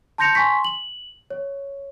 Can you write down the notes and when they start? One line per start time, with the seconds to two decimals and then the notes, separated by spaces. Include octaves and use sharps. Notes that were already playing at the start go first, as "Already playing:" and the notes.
0.18 A5 C6 G6 A#6 C#7 F7
0.35 G#5 C6 C#6 B6
0.64 F#7
1.30 C#5